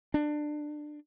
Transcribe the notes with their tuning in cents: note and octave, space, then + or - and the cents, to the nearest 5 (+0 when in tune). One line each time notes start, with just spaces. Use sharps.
D4 +20